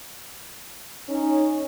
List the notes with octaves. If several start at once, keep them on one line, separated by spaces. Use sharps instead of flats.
C#4 D#4